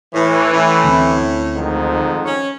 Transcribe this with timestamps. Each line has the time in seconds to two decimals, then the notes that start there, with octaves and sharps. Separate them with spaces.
0.14 A2 E3
0.52 A2 C#4
0.84 D2 G#3 C4
1.56 F2 G#2 D#3
2.25 C#4